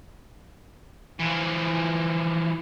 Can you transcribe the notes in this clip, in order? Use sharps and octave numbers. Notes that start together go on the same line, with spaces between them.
E3 F3